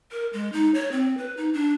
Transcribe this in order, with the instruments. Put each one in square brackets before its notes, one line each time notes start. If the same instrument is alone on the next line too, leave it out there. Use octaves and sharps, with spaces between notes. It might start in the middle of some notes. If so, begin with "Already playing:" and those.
[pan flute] A#4
G#3
D#4
C#5
C4
B4
D#4
D4